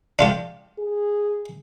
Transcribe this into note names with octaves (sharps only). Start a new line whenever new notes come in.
D4 F4 G4
G#4